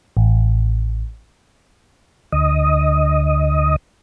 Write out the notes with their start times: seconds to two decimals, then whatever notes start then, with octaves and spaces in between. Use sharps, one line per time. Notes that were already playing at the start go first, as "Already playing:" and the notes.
0.17 A1
2.32 D2 D#5